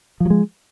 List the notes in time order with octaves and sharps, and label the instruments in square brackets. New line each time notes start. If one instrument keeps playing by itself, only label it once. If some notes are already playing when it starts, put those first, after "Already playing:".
[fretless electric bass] F3
F#3
G#3